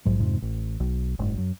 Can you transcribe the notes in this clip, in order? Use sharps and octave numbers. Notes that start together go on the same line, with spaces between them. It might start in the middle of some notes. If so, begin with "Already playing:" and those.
A#1 G#2 F#3
F2 G#2 C3
A1
B1
F#1 G#2
F#2